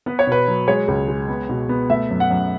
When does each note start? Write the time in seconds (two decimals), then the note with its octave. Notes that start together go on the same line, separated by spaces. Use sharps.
0.06 B3 B4
0.19 C#5
0.27 B2 B4
0.48 F#3
0.68 G#3 C#5
0.88 C#2
1.08 G#3
1.28 B3
1.49 B2
1.69 B3
1.90 A3 E5
2.10 F#2
2.20 F#5
2.31 F#2